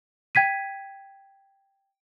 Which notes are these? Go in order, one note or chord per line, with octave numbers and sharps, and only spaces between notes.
G5 G#6 B6 D#7